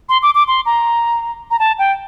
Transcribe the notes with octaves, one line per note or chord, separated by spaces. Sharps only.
C6
D6
D6
C6
A#5
A#5
A5
G5